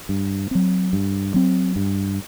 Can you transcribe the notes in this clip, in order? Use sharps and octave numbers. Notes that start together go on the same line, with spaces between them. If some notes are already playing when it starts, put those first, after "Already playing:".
G2
F#3 C4
G2
F#3 C4
G2